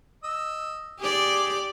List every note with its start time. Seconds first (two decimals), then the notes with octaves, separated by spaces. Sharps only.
0.24 D#5 E6
1.00 G4 G#4 D5